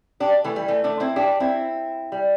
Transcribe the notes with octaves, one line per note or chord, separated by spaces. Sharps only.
D4 G4
E3 A3
G3
E3 A3
A3 D4
C4 E4
D4 G4
C4 E4
G3